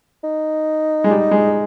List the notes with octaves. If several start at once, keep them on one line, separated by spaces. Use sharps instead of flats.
D#4
G#3
G3
G#3